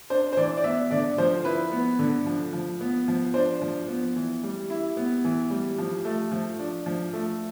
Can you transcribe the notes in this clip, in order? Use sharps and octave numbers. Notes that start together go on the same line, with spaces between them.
D4 C5
C5
E3 D5
D5
B3 E5
D3 D5
F3 C5
E4 B4
B3
D3
F3
F3
B3
F3
D4 C5
F3
B3
E3
G3
E4
B3
E3
G3
F3
A3
F3
D4
F3
A3